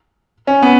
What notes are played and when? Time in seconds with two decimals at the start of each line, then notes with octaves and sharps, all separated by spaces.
0.47 C#4
0.62 B3